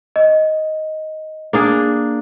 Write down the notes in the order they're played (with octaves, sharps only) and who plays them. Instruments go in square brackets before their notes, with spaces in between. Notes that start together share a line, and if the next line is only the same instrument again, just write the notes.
[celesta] D#5
[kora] A#3 D4 G#4